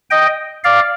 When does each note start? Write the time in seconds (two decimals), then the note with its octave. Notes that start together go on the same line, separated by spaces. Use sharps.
0.10 D#5 G5
0.64 D5 F5